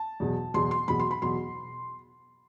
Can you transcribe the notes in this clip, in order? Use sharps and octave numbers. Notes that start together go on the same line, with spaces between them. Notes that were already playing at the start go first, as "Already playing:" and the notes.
Already playing: A5
E2 B2 F#3
E2 B2 F#3 C6
C6
E2 B2 F#3 B5
C6
B5
E2 B2 F#3 C6